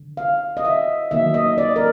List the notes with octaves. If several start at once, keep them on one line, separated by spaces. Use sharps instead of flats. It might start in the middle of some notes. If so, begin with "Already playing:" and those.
Already playing: D3
F5
D#5
E5
D#3 F#3 A#3 E5
D#5
D5
A#4